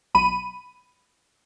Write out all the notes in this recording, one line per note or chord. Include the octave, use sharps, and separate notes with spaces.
B1 B5 D#7